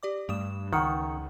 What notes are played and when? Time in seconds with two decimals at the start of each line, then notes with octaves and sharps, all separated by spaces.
0.03 G4 D5 D6
0.29 G2 G3 A3 D#6 E7
0.73 C#2 D#3 F#5 C#6 D#6 C#7